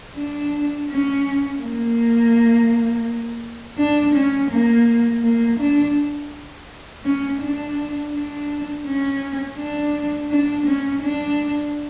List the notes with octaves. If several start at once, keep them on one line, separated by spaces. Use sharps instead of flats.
D4
C#4
A#3
D4
C#4
A#3
A#3
D4
C#4
D4
D4
C#4
D4
D4
C#4
D4